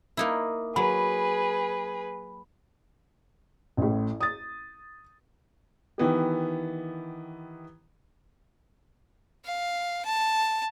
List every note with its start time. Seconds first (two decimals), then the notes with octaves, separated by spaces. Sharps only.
0.17 A#3 D#4 E4
0.76 F#3 G#4 B4 B5
3.77 A1 A2
4.20 D#6 A6
5.98 D#3 E3 B3 G4
9.45 F5
10.05 A5